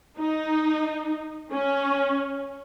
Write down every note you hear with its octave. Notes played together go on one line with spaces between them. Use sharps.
D#4
C#4